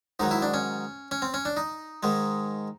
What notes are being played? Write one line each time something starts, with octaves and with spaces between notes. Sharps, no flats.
G#2 D#3 F#3 D#4
E4
D4
C#4
C#4
C4
C#4
D4
D#4
G#2 D#3 G#3